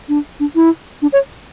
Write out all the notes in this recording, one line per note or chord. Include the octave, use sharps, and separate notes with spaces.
D4
D4
E4
D4
C#5